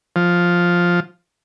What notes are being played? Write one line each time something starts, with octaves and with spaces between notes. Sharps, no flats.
F3